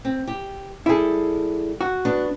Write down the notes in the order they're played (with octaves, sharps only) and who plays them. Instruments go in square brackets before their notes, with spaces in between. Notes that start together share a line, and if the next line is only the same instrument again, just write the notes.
[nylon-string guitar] C4
G4
[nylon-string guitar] G3 A4 [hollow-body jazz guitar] E4 G#4
[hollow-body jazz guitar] F#4
[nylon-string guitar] B3 D4